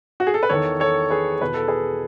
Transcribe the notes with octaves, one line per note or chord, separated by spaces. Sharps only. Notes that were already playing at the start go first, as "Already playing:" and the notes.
F#4
G#4
A4
B4
E2 D#3 A4 C#5
A4 C#5
G#4 B4
E2 B2 B4
A4
G#4 B4